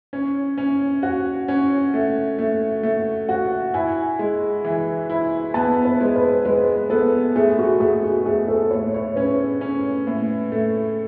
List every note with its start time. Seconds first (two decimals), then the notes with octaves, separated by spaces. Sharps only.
0.13 C#4
0.58 C#4
1.03 F#4 F#5
1.48 C#4
1.94 A3
2.39 A3
2.83 A3
3.29 F#4 F#5
3.74 E4 G#5
4.19 G#3
4.64 E3
5.10 E4
5.54 B3 A5
5.85 B4
6.01 G#3
6.16 B4
6.45 G#3 B4
6.90 B3 A4
7.36 A3 G#4
7.59 F#4
7.80 A3 G#4
8.04 F#4
8.26 A3 G#4
8.48 A4
8.71 A2 C#5
8.94 C#5
9.16 C#4 B4
9.61 C#4
10.07 A2
10.52 A3